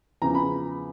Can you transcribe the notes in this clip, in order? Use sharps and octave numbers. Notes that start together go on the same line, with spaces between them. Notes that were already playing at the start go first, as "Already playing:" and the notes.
E2 C#3 F3 A#5
B5